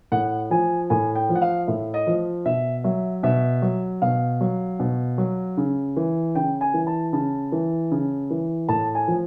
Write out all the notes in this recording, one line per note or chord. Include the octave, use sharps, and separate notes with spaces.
A2 F#5
F3 G#5
A2 G#5
G5
F3
F#5
F5
A2 E5
D#5
F3
B2 E5
F#3 E5
B2 E5
F#3
B2 F5
F#3
B2
F#3
C#3
E3
C#3 G5
G#5
E3
A5
C#3 A5
E3
C#3
E3
A2 A5
G#5
F3